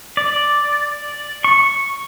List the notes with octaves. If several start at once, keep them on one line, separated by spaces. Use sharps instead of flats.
D5
C#6